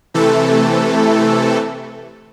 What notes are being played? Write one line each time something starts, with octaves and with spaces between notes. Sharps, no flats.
C3 E3 A3 A4